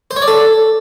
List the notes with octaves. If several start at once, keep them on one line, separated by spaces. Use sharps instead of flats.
C5
C#5
D5
A4